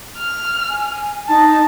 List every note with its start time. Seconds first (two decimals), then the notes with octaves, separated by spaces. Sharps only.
0.18 F6
0.69 G#5
1.28 D#4 A5